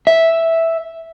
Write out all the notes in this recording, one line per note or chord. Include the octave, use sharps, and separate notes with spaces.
E5